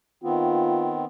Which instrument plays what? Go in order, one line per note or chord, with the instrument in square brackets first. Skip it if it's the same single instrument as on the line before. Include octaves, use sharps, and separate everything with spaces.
[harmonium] D#3 B3 C4 [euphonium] F4